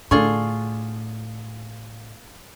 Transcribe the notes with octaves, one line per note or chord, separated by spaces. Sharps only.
A2 D3 D4 F4 G#4 A4 C#6